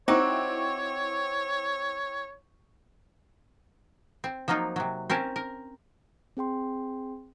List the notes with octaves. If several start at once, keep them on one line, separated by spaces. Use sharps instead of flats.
C4 D#4 E4 F#4 C5 C#5 C#6 D6
C4
F3 F#3 A#3 D#4 F4
C3 F#3
C4 C#4 A#4 A5
A#4
C4 G#4 G5 C6